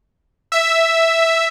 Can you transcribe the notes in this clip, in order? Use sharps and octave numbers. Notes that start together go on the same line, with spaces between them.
E5